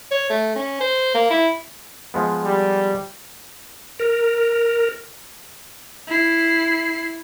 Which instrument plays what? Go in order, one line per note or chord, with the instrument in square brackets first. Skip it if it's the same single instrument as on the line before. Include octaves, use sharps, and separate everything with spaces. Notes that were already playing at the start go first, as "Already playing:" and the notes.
[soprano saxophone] C#5
A3
C#4
C5
A#3
E4
[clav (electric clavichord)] F3 G#3 B3
[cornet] G3
[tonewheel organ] A#4
[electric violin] E4 C7